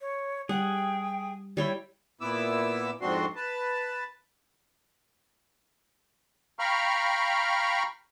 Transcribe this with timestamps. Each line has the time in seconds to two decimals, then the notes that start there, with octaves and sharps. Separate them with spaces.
0.01 C#5
0.49 G3 G#4 F#5 G5
1.57 G3 E4 C#5 G5
2.21 A#2 B3 E4 D6 E6
3.01 F2 G#2 C4 D4 F#4 C6
3.36 B4 A5
6.59 F5 G5 A#5 B5 C#6 F6